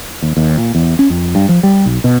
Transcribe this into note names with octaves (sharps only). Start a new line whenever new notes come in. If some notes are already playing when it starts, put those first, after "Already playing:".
D#2
D#2
A#2
E2
C#4
F2
G2
F3
G3
B1
B2